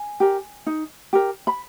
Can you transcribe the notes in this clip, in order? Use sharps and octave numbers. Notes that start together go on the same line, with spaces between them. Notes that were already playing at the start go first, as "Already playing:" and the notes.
Already playing: G#5
G4 A#4
D#4
G4 A#4
B5